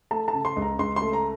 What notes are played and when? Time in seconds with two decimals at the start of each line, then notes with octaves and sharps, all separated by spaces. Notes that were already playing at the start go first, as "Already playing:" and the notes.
0.11 A3 A5
0.28 A5
0.33 C#3
0.45 C6
0.56 C#2
0.62 A#5
0.79 C#2 C6
0.96 C6
1.02 A3
1.13 A#5